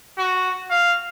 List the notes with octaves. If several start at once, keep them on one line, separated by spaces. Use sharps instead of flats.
F#4
F5